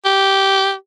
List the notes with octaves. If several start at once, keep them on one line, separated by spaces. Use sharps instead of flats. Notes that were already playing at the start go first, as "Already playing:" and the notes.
G4